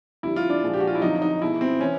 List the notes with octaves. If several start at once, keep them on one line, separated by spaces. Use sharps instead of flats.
F2 D3 G3 E4
F4
D4
A#2 F3 G#3
G4
F#4
F4
E4
F2 D3 F#3 D#4
D#4
B2 G#3 E4
C4
E3 C#4